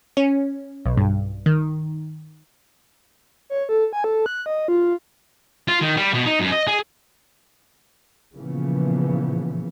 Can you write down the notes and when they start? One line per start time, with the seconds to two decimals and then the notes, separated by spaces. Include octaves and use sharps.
0.17 C#4
0.85 B1
0.97 G2
1.46 D#3
3.50 C#5
3.69 A4
3.93 G#5
4.04 A4
4.26 F#6
4.46 D#5
4.68 F4
5.68 F4
5.81 D#3
5.97 G3
6.14 B2
6.26 D#4
6.40 F#2
6.52 D#5
6.67 G#4
8.34 A#2 C#3 E3 F3 B3